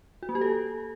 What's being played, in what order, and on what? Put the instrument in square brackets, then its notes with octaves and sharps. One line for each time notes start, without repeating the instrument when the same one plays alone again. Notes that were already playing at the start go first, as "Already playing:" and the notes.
[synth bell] F#4
A#3
G4
A4